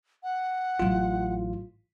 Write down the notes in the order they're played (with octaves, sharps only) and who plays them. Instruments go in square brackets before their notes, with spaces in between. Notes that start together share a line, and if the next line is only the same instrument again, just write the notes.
[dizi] F#5
[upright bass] A1 F#3 [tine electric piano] F4